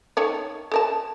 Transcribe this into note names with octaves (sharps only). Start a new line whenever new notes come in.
D#3 A4 C#5
A4 A#4 A5